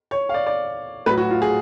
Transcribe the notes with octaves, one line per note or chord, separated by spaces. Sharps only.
C#5
F5
D5
D5
A2 F#3 B4
F#4
F4
G#4